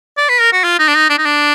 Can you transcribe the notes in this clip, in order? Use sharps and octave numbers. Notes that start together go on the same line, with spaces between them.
D5
B4
A#4
F#4
F4
D#4
D4
D#4
D4
D#4
D4